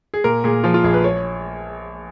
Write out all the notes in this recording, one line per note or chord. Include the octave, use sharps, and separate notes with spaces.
G#4
A#2 A#4
A#2 G#4
F3 F4
F4
A#1 G#4
B4
C#5